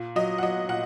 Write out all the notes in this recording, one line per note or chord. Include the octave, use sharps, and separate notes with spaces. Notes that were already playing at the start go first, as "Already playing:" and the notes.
Already playing: A#2
F#3 D#5
F#5
F#3 D#5
A#2 F#5